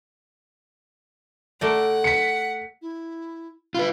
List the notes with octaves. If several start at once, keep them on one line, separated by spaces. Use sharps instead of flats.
A3 A#4 D5 F#5
B6 C#7
E4
F4 B4 B5